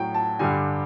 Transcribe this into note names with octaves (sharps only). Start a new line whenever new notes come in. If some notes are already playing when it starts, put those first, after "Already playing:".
Already playing: A2 F#3 G5
A5
G2 D3 G3 G#5